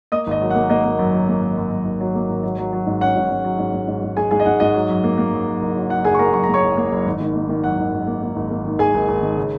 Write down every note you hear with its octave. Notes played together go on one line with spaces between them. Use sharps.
A#3 D#5 D#6
G#1 D#5
F#3
F#5
A#3
A#3 D#5
A#3
F#2
F#3
A#3
G#1
F#2
F#2
G#1
F#3
A#3
G#1
F#3
F#3
F#3
G#2
C#4 F#5
G#2
G#2
F#3
G#2
G#2
G#2
G#2
G#2 G#4 G#5
G#2 G#4 G#5
D#5
G#2 F#5
G#2 D#5
F#3
F#2
A#3
A#3
F#2
F#2
F#1
F#3
F#3 F#5
F#1 G#4 G#5
C#6
A#3 A#4 A#5
F#2 C#6
A#3 A#5
C#5 C#6
F#1
A#3
F#1
G#1
D#3
A#3
D#3
F#2 F#5
G#1
F#2
A#3
A#3
G#1
A#3
D#3
G#1 G#4 G#5
G#1
G#1
D#3
C#3